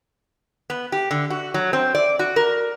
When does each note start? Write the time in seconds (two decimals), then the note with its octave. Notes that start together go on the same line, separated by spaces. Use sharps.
0.70 B3
0.92 G4
1.11 D3
1.30 F#4
1.54 F#3
1.73 C4
1.95 D5
2.19 F#4
2.36 A#4